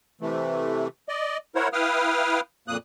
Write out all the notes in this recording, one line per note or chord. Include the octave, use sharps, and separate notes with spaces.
C3 E3 A3
D5 D#5
E4 A#4 C5 C#5 F#5
E4 B4 F5 G5 D#6 F6
F2 A#2 A#3 D#6 F#6